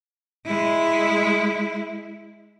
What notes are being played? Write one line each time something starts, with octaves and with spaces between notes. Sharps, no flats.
G#3 E4